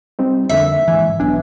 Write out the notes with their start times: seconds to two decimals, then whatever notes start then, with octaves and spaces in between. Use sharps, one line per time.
0.19 G3 C4 D#4
0.50 F2 D3 A#3 E5
0.88 G#2 E3 G#5
1.20 B1 B3 D4 G#5